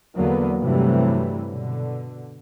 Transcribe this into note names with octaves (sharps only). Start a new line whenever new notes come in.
E2 D3 F#3 A#3 B3
G2 C3 E3 F#3 G3 A3
B2 D3